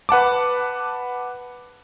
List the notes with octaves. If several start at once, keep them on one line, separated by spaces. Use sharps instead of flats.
B4 F#5 A5 D6